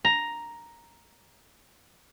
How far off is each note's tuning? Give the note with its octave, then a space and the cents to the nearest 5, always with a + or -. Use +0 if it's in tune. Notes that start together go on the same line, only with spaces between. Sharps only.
A#5 +5